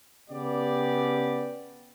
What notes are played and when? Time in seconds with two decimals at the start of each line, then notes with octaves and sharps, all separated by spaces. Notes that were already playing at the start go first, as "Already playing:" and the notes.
0.30 C#3 B3 G4 D5